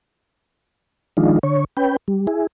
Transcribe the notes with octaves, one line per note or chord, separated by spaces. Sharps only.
D#3 F3 G#3 D4 D#4 F4
D3 C#5
C#4 B4 G5
G3
E4 G#4